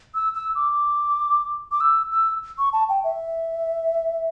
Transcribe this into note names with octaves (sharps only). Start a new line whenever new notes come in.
E6
E6
D6
D6
E6
E6
C#6
A5
G5
E5